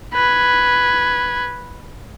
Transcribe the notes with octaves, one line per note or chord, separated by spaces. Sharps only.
B4 G#6